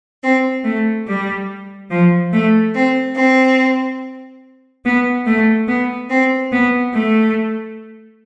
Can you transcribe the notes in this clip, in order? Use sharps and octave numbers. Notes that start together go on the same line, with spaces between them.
C4
A3
G3
F3
A3
C4
C4
B3
A3
B3
C4
B3
A3